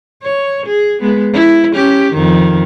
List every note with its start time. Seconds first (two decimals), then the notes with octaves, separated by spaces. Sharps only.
0.23 C#5
0.67 G#4
1.01 G#3 B3
1.33 E4
1.74 C#4 G4
2.13 F2 D#3